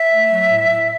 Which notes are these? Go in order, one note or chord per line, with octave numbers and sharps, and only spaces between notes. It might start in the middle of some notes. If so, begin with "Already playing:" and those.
Already playing: E5
A3
F#3
A2
A2